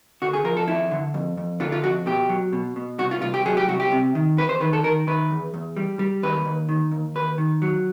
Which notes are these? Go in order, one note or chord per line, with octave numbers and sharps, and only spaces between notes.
D3 F#4
G#4
F3 A#4
A4
F2 E4
D3
F2
F2
D3 F4
F4
F2 F#4
B2 G4
F#3
B2
B2
C2 F#4
F4
C2 F4
G4
F#3 G#4
G4
C2 F#4
G4
C3
D#3
E2 B4
C5
D#3 B4
A4
D#3 A#4
D#3 B4
E2
E2
G3
G3
D#2 B4
D#2
D#3
D#2
D#2 B4
D#3
F#3